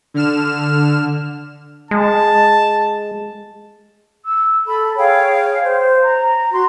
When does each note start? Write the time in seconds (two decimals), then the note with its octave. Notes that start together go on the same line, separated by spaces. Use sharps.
0.14 D3 F6 E7
1.91 G#3 A5
4.25 E6
4.67 A4 B5
4.97 G#4 C#5 F5 G5
5.62 C5
6.02 A#5
6.52 F#4 C6